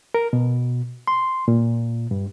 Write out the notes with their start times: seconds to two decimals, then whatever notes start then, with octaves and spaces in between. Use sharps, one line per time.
0.14 A#4
0.33 B2
1.07 C6
1.48 A#2
2.11 G2